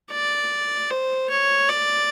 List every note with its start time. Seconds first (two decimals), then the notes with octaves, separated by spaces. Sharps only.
0.11 D5
0.90 C5
1.31 C#5
1.69 D5